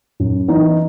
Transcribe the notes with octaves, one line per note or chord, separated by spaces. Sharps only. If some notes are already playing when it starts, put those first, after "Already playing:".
F#2
E3 B3 D#4